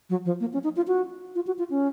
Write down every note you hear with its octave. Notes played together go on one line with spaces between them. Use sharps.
F#3
F3
A#3
C#4
D#4
F4
F#4
F4
F#4
F4
C#4